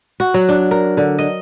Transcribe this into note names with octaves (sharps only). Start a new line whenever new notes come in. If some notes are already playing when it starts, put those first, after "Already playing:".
F#4
F#3
D4
A#4
D3
D#5